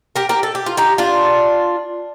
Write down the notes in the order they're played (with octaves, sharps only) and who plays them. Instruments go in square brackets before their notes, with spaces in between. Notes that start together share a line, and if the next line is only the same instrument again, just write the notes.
[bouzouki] G4 A#4
G4 A#4
A4
G4
F4
D#4 G4
D4 F4